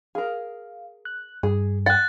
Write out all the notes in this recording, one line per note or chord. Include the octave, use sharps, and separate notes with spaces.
G#4 A#4 F5
F#6
G2 G#4
F#5 F#6 A6